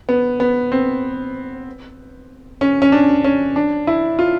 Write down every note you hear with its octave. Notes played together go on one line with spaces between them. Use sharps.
B3
B3
C4
C#4
C#4
D4
C#4
D4
E4
F4